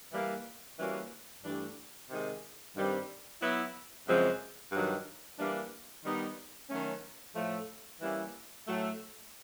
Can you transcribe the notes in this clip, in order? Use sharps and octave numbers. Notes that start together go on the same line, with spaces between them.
E3 G3 A#3
E3 G3 A#3 C#4 F#4
G2 E3 A3 D4 G4
C3 D#3 G#3
G2 D#3 G3 C4
F#3 B3 E4
F#2 C#3 F3 G#3 C4
G2 D#3 F#3
E3 G3 A#3 D4
D#3 G3 B3 D#4
D#3 F#3 A3 C#4
A2 F3 A3
E3 G3 A#3 C#4 E4
A2 F#3 A3